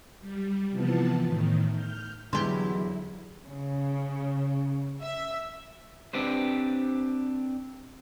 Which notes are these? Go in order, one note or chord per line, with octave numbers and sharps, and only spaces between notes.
G3
C3 E3 F3 B3 A5
A2 D#3
F6 G6
E2 D3 F#3 E4 G4 C6
C#3
E5
C4 D4 G4 B4 C5